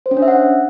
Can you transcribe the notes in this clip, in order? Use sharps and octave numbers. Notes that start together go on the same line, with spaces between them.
C5
C#4
D4
E5
F#5